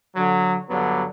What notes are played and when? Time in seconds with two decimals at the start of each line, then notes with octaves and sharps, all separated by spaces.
0.15 D3 F#3
0.70 G2 D3 F#3 B3